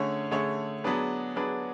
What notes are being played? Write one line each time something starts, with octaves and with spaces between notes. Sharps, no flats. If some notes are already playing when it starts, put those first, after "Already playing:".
Already playing: D3 A3 C#4 G#4 C#5
D3 A3 C#4 G#4 C#5
F#3 B3 D4 G#4 B4
F#3 B3 D4 G#4 B4